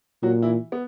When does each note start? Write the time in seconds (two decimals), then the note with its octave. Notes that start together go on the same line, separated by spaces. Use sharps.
0.23 A#2 F#3 F#4
0.42 E3 E4
0.72 B3